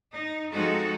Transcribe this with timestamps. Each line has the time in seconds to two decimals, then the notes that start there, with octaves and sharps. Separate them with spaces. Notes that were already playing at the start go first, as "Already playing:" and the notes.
0.14 D#4
0.51 F3 G#3 C4 D#4 F#4 A4